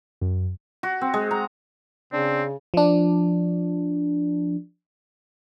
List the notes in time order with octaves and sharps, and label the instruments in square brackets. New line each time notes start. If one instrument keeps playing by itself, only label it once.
[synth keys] F#2
[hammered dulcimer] F#4
C4
G#3
A#5
[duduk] C#3 [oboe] C4 [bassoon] D4
[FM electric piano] F3 D4